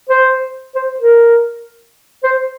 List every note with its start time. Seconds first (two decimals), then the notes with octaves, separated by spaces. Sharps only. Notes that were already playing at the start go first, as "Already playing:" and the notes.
0.09 C5
0.75 C5
1.00 A#4
2.23 C5